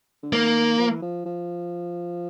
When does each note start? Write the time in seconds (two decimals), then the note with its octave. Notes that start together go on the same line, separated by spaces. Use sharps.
0.23 D3
0.33 D#3 A#3
0.78 F3
0.90 E3
1.02 F3
1.25 F3